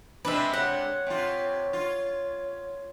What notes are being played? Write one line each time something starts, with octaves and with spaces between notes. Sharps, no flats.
C3 G#3 D4 B4 E5
C#5 F#5
C3 F4
F4